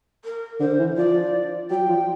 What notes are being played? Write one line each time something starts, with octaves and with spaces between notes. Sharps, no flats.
A#4
D3 C5
E3
F3 D5
F#3 G5
F3